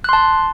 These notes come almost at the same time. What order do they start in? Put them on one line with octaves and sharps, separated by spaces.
F#6 C6 A5